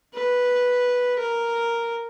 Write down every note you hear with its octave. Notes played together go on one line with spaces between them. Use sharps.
B4
A#4